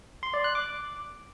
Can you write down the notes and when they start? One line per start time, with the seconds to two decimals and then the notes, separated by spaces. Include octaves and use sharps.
0.23 C6
0.34 D5
0.44 F#6
0.55 D6